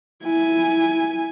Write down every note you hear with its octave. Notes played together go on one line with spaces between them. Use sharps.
E4 G#5